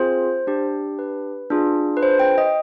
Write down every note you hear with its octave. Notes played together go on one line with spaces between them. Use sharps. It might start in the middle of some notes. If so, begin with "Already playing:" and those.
Already playing: C4 F4 G#4 C5
D4 G4
B4
D4 F4 G#4
B4
C5
G5
D#5